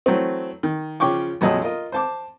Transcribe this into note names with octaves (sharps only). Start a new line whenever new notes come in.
E3 F#3 A3 C4
D#3
C#3 F3 C#5 G5 C#6 D6
A#1 F2 F#3 D#5 A5
F4 A#4 D#5
C5 A5 D6